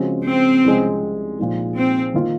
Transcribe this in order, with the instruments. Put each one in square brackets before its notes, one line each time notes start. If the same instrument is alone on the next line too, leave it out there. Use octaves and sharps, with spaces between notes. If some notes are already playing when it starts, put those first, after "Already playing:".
Already playing: [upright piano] C#3 F3 G#3 C4 F#4
[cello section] C4
[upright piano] C2 C3 F3 G#3 C#4
A#2 F3 G#3 D#4
[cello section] C4
[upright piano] D#3 A#3 F4